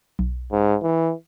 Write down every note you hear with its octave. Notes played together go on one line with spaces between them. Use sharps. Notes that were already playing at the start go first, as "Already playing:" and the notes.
B1
G#2
E3